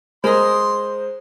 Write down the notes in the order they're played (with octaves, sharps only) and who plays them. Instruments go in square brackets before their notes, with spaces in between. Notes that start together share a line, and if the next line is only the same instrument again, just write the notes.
[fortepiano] G#3 [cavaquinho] A#4 D#5 [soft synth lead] C5 [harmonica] C6